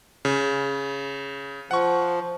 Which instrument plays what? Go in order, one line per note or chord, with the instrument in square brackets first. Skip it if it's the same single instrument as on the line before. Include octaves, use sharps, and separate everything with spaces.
[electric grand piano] C#3
[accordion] F3 [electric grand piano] F#5 C#6